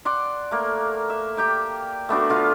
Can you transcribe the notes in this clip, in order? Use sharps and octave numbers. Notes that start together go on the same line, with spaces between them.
D5 F#5 C6
A3 A#3
E5
G4 G5 A#5
A3 B3 D4 F#4
D3 F4 F5 B5